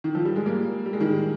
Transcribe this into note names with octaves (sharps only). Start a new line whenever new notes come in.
D#3
F3
G3
G#3
G3 A#3
G3
G#3
D#3 G3